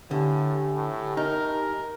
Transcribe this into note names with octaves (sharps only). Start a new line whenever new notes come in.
A2 D3 G4 G#5
A2
D#4 A#4